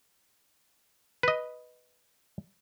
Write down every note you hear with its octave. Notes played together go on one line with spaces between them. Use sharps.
B4 D#5